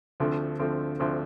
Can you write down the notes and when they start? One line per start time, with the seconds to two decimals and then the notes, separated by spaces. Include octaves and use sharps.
0.20 D2 D3 F3 A3 C4
0.59 D2 D3 F3 A3 C4
1.00 D2 D3 F3 A3 C4